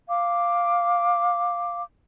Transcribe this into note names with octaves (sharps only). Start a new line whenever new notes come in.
F5 D6